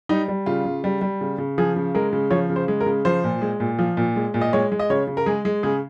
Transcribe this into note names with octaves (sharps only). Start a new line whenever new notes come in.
G3 D#4
G3
C#3 F4
C#3
G3
G3
C#3
C#3
F3 G#4
C#3
G#3 A#4
C#3
F3 C#5
C#3
C5
G#3
A#4
C#3
F3 C5
A#2
G#3
A#2
F3
A#2
G#3
A#2
D#5
G#3 C#5
G#3
D#5
C#3 C#5
C#3
A#4
G#3 G#4
G#3
C#3 G#4